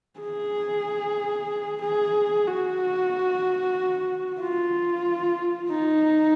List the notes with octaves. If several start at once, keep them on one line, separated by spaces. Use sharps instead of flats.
G#4
G#4
F#4
F4
D#4